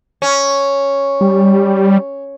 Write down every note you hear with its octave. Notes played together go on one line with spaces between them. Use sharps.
C#4
G3